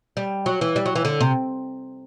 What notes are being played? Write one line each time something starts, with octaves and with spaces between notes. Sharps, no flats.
G3
F#3
E3
G3
F#3
E3
D3
C3